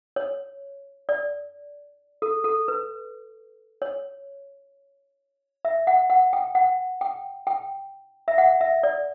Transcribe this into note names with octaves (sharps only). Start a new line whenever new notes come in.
C#5
D5
A4
A4
B4
C#5
E5
F#5
F#5
G5
F#5
G5
G5
E5
F#5
E5
D5